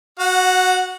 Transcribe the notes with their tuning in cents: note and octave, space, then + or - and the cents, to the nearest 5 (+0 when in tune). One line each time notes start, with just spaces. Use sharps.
F#4 +0 F#5 -20